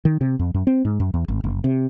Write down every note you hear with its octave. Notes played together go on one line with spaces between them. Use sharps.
D#3
C3
F2
F#2
C4
G#2
F#2
E2
G#1
F#1
C3